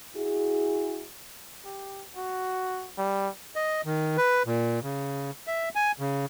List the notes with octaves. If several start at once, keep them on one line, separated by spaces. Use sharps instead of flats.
E4 F#4 G#4
G4
F#4
G3
D#5
D#3
B4
A#2
C#3
E5
G#5
C#3